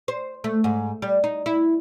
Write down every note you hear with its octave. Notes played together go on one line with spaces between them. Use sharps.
C5
A3
G#2
G3
D#4
E4